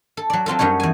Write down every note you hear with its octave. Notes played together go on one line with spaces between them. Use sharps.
A4
F#3 D5
F#3 C4 F4 A4
F#2 F#3 G3 D#4 C#5
E2 G#5